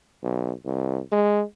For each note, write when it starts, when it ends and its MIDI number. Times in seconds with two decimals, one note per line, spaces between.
0.23 0.52 35
0.65 1.01 36
1.12 1.42 56